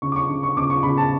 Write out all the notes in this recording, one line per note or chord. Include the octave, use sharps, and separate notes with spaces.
C#3 C#6
D6
C#6
C#3
C#6
C#3 D6
C#6
C#3 B5
A5